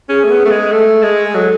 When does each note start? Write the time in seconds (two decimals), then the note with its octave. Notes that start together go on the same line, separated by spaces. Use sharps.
0.09 C#4 G#4
0.24 A3
0.30 B3
0.45 A3
0.51 G#3
0.72 A3 A4
1.03 G#3
1.24 G#4
1.34 F#3 A4